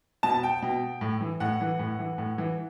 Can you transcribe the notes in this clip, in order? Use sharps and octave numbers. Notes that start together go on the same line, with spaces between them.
B2 A5
G5
B2
A2
E3
A2 F#5
E3
A2
E3
A2
E3